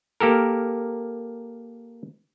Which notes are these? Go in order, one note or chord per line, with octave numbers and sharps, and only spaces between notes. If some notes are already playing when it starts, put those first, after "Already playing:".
A#3 G4 A4 A#4